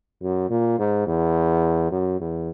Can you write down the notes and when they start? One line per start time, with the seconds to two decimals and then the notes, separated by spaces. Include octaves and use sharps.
0.22 F#2
0.50 A#2
0.78 G#2
1.07 E2
1.91 F#2
2.20 E2